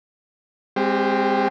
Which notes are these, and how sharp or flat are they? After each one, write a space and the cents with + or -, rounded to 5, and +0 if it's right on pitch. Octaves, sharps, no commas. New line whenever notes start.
G#3 -30 C4 +0 G4 +0